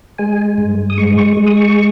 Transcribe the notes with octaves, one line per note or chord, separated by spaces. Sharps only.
G#3 G#5
G2
D#6
G#3 C#6
C#6
G#3
D#6
C#6